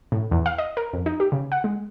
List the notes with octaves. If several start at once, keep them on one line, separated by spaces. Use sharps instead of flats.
A2
E2
F5
D#5
A#4
F2
D#4
G4
C#3
F#5
G#3